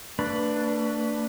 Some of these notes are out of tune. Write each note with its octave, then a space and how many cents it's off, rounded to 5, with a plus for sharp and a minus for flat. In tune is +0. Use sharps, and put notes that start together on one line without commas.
A3 +45 D4 +0 B4 +0